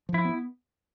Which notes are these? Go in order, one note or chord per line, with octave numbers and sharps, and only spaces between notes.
F3
E4
B3